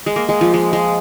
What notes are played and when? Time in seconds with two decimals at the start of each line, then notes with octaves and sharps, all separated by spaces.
0.06 G#3
0.16 A#3
0.29 G#3
0.41 F3
0.54 G#3
0.73 G#3